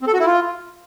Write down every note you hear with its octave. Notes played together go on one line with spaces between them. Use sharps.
C4
A4
F#4
E4
F4